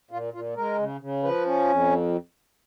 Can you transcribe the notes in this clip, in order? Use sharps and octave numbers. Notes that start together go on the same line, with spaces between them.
A#2 F4
A#2 F4
G#3 A#4
C#3
C#3
F3 B4
C#4
F2